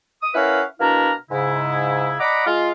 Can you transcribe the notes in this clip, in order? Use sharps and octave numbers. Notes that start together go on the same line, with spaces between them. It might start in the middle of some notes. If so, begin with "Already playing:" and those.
D#6
C#4 E4 A#4 B4 F5 F#5
B2 A#3 D4 E4 A#5 F6
G#2 C#3 E4
D5 D#5 F#5 A#5 B5 D6
G#3 F4 F5